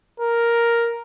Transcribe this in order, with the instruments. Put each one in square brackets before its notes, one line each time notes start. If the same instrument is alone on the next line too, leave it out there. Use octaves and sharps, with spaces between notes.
[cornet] A#4